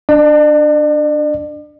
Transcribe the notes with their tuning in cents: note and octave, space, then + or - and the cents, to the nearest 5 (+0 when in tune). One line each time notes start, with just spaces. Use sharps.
D4 +0 D5 +40